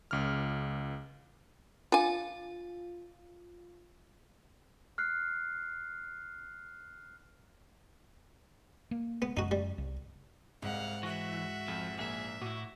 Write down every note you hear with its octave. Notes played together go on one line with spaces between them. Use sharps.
C#2 F6
D4 F4 F5 G#5
F6 F#6 C7
A#3
B3
F#2 D#4 F#4
G3
C2
C2 G#2 F5 F#5
E3 F#4 E5 C#6 A#6
F2 F3
A#1 A#3 G#4 E5 E7
A2 E4 F#4 D6